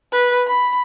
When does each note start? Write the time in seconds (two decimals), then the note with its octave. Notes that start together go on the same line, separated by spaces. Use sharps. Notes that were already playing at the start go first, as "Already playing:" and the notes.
0.12 B4
0.48 B5